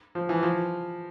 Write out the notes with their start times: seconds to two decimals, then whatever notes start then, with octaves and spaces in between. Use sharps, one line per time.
0.15 F3
0.29 E3
0.43 F3